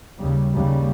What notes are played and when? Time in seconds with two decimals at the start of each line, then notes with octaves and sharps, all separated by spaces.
0.19 D#2 C#3 G3
0.54 D#2 C#3 G3